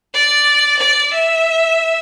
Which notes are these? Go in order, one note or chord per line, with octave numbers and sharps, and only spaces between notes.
D5
D5
E5